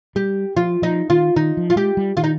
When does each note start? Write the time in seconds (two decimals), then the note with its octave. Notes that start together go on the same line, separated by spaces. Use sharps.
0.16 G3 G4
0.57 F3 F4
0.82 F3 D#4
1.10 D#3 F4
1.36 D#3 D#4
1.57 F3
1.70 F4
1.76 G#3 G4
1.97 G3
2.17 D#3 F4
2.24 D#4